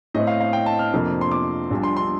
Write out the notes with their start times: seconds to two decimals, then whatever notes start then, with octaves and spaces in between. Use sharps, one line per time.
0.14 A2 A3 C4 D#5
0.27 F5
0.40 F5
0.53 G5
0.66 A5
0.79 F6
0.93 F2 C3 F3 A#3 D4
1.21 C6
1.31 D6
1.70 A#1 A#2 G3 D4
1.83 C6
1.97 C6